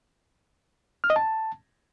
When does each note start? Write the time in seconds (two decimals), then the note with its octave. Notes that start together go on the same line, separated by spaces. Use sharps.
1.04 F6
1.10 D#5
1.16 A5